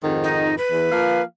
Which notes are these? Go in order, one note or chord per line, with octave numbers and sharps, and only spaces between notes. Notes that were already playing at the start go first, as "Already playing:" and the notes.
F2 G#2 D#3
D#4
B4
E2
F3 A#3 F5